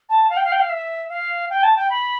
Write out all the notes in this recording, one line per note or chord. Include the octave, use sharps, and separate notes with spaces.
A5
F5
G5
F5
G5
F5
E5
F5
G5
A5
G5
B5